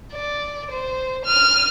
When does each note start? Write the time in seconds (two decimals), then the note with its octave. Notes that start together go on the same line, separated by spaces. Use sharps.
0.12 D5
0.71 C5
1.25 F6 D#7